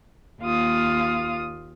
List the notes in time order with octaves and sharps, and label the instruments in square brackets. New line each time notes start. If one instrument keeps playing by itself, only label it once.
[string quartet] D#2 A#3 F4 F5 D#6